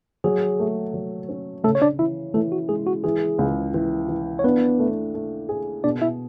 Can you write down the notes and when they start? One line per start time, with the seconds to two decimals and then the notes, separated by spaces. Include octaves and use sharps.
0.24 F#3 G#4
0.59 A3
0.94 F#3
1.29 C#4
1.64 C#3 A3 A4
1.75 C#5
1.82 D4 D5
1.99 E3 E4 E5
2.34 E3 A3 A4
2.52 F#4
2.69 G#3 G#4
2.87 F#4
3.04 E3 G#4
3.39 C#2
3.74 E3
4.09 E3
4.39 C#5
4.44 B3 D4 B4
4.79 A3
5.14 A3
5.49 G#4
5.84 B2 D4 D5
6.02 E4 E5